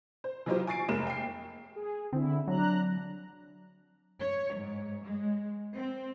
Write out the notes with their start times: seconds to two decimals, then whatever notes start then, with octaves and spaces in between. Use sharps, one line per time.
0.24 C5
0.46 E3 F#3 D#4 F4 G4 C5
0.67 G#5 C#6 A6 C7 D7
0.89 F1 G#3 A#3 E7
1.07 G5 C7
1.76 G#4
2.13 D3 C4 E4
2.48 F#3 D4 A#5 F#6
4.21 C#5
4.56 G#2
5.07 G#3
5.74 C4